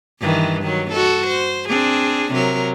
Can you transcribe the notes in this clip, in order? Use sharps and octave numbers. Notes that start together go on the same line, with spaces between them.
G2 D#3 E3
D#3 F#3
F#4 A4
C5
C4 D4 G#4
C3 F#3 A#4